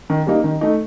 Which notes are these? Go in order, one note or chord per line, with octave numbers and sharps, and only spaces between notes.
D#3
G3 A#3 D#4
D#3
A3 D#4